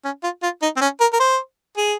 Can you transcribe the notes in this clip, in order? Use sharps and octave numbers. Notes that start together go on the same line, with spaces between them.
C#4
F4
F4
D#4
C4
C#4
A#4
A#4
C5
G#4